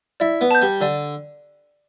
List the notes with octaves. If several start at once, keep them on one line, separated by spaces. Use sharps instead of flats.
E4 D5
B3
A5 G6
G3
D3 D5